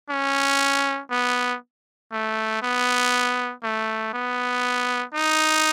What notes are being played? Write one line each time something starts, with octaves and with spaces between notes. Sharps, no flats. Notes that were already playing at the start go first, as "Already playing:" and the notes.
C#4
B3
A3
B3
A3
B3
D#4